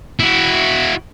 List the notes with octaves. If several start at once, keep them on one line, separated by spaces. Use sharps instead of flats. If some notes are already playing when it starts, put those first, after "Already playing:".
E4 F#4